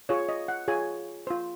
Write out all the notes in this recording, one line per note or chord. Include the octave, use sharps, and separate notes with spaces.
F4 G#4 C#5
D#5
F#5
F4 G#4 C#5 G#5
F4 C5